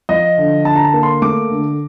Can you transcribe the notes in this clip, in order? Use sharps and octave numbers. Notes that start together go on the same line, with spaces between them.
F3 D#5
D3
D3 A5
A#5
A5
A#3
C6
A3 D6
D3